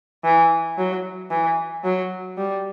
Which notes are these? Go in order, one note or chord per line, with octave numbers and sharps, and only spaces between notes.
E3
F#3
E3
F#3
G3